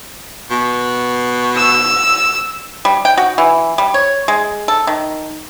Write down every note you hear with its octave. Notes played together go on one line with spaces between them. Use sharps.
B2
E6
G3
G5
F#4
E3
G3
C#5
G#3
A4
D#3